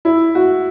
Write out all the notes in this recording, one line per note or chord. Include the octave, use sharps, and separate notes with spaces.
E4
F#4